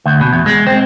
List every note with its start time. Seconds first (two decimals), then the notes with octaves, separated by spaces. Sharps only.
0.06 D2
0.21 B2
0.33 E2
0.46 G#3
0.67 C4